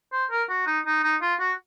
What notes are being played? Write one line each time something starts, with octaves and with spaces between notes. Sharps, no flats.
C5
A#4
F#4
D#4
D#4
D#4
F4
F#4